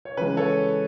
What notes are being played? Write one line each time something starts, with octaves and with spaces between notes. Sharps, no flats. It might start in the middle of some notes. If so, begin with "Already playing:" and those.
C#5
C#3 E3 G#3 B4
A4 C#5